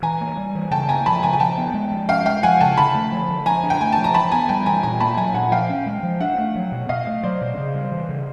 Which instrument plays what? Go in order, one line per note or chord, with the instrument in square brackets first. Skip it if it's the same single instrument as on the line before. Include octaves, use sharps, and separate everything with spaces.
[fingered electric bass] E3 [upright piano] G#5 A#5
[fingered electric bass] A#3
G3
E3
[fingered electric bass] C#3 [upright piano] G5 A5
[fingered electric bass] A#3 [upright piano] G#5 A#5
[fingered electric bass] F3 [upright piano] A5 B5
[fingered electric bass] C#3 [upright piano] G#5 A#5
[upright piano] G#5
[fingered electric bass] F3 [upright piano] G5 A5
[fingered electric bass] B3
G#3
F3
[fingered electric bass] C#4 [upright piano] F5 G5
[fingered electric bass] G#3 [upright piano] F5 G5
[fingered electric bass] F3 [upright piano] F#5 G#5
[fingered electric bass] C#3 [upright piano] G5 A5
[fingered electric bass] D3 [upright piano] A5 B5
[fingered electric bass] A3
F3
D3
[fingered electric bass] F3 [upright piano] G#5 A#5
[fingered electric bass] D4
[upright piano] G5
[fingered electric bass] A3 [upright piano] G#5
[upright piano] A5
[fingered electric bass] F3
[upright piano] A#5
[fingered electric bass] E3 [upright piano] A5 B5
[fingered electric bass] B3 [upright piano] G#5 A#5
[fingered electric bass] G3 [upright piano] G5 A5
[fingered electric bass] E3 [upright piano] G#5 A#5
[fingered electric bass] A#2 [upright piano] G#5 A#5
[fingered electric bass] A#3 [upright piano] A5 B5
[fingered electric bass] F#3 [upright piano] G#5 A#5
[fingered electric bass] A#2 [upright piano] F#5 G#5
[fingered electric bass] F3 [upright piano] F5 G5
[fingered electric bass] C#4
G#3
F3
[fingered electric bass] D4 [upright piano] E5 F#5
[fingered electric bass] A3
F#3
B2
[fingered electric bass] B2 [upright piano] D#5 F5
[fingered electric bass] A3
[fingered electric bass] F#3 [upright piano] C5 D5
[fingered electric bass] B2
C#3
G3
E3
C#3